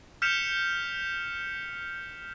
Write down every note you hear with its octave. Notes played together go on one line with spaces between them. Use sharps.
F6 G6 B6 C#7 E7 F7